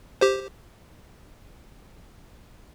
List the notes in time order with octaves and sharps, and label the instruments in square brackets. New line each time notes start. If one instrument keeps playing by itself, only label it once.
[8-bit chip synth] G4 C5